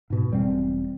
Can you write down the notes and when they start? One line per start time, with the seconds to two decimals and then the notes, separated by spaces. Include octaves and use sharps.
0.10 G#2 B2
0.30 E1 G3 C4